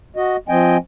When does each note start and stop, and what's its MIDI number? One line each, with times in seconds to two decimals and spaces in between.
0.16 0.37 66
0.16 0.37 75
0.49 0.77 53
0.49 0.77 60
0.49 0.77 75
0.49 0.77 79
0.49 0.77 80